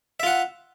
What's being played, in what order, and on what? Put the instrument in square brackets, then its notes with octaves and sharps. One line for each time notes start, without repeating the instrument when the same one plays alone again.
[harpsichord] E5
F4
F#5